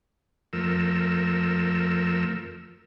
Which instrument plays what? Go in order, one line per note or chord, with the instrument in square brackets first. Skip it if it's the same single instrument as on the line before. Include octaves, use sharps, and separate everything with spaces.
[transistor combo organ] F2 F3 A3 A#4 E6